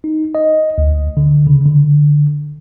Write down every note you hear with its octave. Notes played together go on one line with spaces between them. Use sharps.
D#4
D#5
D2
D3
C#3
D3